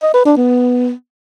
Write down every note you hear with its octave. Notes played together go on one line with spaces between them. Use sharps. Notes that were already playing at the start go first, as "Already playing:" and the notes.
D#5
B4
D4
B3